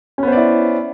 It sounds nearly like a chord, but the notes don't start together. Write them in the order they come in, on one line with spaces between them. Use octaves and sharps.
C#4 B3 C5 D5 E4